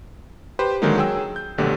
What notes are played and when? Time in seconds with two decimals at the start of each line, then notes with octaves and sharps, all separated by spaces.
0.59 G4 B4 C5
0.82 D3 D#3 F#3 G#3 A#3 D#4
0.97 F#3 G#4 G5 E6
1.36 G6
1.58 A#1 B2 D3 F#3 A3 G4